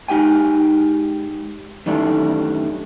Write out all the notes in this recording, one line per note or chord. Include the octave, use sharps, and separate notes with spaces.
G#2 D#4 G4 G5 G#5
F#2 D#3 E3 G3 A3 D4